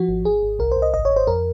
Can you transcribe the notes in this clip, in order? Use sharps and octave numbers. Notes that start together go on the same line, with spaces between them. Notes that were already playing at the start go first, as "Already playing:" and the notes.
Already playing: F3 F#4
G#1
G#1 G#4
G#1
C2 A#4
C5
C2
D#5
G#1 D#5
C#5
G#1
C5
F2 A#4